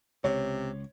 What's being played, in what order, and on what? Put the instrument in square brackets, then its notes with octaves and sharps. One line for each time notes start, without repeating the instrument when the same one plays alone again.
[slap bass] C#2 [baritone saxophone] C3 [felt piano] C#5